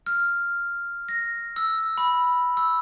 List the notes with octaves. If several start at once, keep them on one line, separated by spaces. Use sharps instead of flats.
F6
A#6
E6
B5
E6